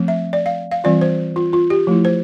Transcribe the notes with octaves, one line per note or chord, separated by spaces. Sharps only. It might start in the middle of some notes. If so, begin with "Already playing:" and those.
Already playing: F3 A3 C4
E5
D5
F5
F5
E3 G3 C4 F4 D5
C5
F4
F4
G4
F3 A3 E4
C5